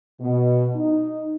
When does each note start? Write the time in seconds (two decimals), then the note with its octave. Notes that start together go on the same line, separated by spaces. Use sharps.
0.21 B2
0.76 D#4